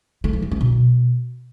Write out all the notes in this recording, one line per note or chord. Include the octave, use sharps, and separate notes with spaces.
A3
F3
E3
C#4
B2